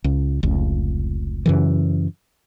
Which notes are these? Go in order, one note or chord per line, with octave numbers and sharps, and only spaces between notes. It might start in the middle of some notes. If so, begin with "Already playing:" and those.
C#2
F1 C#2
F#2 C#3 E3